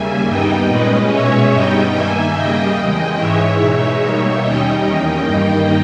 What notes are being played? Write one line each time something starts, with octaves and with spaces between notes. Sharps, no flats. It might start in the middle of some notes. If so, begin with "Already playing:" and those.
Already playing: D#2 C#3 G3 A#3 E5 G#5
G2 G3 B3 D#4 D#5 G5
A#2 G#3 C#4 B4 D#5
B2 G#3 C#4 C#5 E5
G2 G3 B3 D#4 D#5 G5
G2 D#3 A#3 E5 G#5
C#3 G3 A#3 D#5 G5
E2 C#3 G#3 D#5 G5
G#2 E3 G#3 C#5 E5
B2 G#3 D#4
B2 G3 A#3 D#4
D#2 D#3 G3 C#4 D#5 G5
E2 D#3 A#3 C#4
G2 D#3 G3 A#3 D#4 D#5 G5